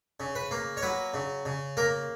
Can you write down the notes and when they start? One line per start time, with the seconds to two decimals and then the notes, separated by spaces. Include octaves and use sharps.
0.20 C#3
0.35 B4
0.51 A#3
0.77 C#5
0.82 F#3 B4
1.14 C#3
1.45 C#3
1.77 A#3 A#4